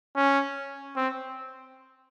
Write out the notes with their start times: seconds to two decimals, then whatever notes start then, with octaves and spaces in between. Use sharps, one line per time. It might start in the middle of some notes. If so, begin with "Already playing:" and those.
0.16 C#4
0.96 C4